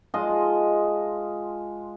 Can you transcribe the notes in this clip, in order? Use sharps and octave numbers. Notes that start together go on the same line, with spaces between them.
G#3 F4 D#5 A5